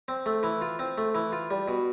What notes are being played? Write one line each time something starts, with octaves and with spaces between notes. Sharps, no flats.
C4
A3
E3
F4
C4
A3
E3
F4
G3
B2